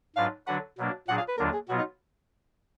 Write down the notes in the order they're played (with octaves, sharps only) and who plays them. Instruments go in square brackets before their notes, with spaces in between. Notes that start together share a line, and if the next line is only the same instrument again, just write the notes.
[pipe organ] G#2 F#3 D4 F4 B4 [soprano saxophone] F5
[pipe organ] D3 F#3 D4 F#4 B4 [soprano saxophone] F#5
[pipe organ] B2 F#3 A#3 D4
[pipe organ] A#2 F#3 D4 G#4 [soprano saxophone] F#5
[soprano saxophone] F5
B4
[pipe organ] D#2 D3 F#3 D4 F4 [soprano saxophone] A#4
[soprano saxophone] G#4
[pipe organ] B2 F#3 B3 F4 [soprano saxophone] F#4
[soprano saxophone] D#4